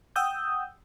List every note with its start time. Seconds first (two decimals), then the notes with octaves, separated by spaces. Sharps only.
0.16 F#5 G5 D#6 E6 G6